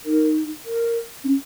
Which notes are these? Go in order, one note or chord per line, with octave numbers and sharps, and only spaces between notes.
D#4 A#4
A#4
C#4